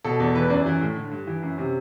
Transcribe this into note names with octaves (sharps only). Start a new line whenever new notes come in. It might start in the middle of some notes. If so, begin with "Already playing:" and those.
B2 A4
E2
E3 B4
F#2 D5
E3
A2
D3
G2
E3
F#2
C3